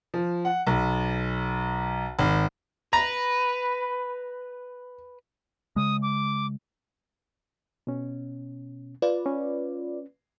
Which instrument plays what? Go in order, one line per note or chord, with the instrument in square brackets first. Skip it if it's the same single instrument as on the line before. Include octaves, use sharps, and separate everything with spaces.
[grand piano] F3
F#5
B1
G#1
[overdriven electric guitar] B4 [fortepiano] A#5
[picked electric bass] C#3 G#3 [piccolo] D#6
[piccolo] D6
[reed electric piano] B2 C#4
[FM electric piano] F4 B4 D5
[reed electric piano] C#4